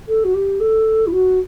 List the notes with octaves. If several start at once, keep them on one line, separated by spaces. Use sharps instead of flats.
A4
F#4
G4
A4
E4
F#4